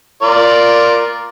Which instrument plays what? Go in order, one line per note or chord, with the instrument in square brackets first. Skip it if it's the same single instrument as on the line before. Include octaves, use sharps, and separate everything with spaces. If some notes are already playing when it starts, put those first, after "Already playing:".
[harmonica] F4 A#4 D5